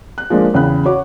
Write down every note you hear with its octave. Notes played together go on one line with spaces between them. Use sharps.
F#6
F3 G#3 A#3 D4
E2 C#3 G5 B5 F#6
F#4 C#5 D6